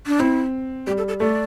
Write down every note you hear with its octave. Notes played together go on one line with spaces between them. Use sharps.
D4
C4 E4
G3 G4
A4
A4
A3 D5